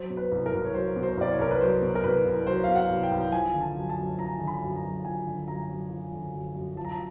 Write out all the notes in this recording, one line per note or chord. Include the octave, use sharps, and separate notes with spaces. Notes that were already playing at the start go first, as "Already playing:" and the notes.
Already playing: F#3 C5
B2
B4
C2
A#4
C2
C#5
F#3 C5
B2
C5
C2 D5
C#5
C2 A#4
B4
F#3 C5
B2
A#4
C2 B4
C2
F#3 C5
B2 F5
F#5
C2
G5
C2
F3 G#5
D3
A5
F#2
A5
F#2
F3 A#5
D3
B5
F#2
A#5
F#2
F3 G#5
D3
F#2 A#5
F#2
F3
D3
F#2
F#2
F3 A5
A#5
A5